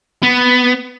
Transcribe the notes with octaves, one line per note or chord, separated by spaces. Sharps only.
B3